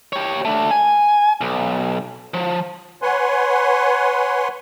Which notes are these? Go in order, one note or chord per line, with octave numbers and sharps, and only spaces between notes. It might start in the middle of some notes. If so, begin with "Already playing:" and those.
G4 C#5
A3 D4
G#5
B1
F3
B4 C#5 F#5 G#5 C6